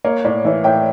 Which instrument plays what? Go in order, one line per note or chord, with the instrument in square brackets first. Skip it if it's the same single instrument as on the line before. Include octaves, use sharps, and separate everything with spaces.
[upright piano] A#3 [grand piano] C#5
[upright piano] A2 [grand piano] D5
[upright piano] E3 [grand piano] C#5 E5
[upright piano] A2 [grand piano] E5 G5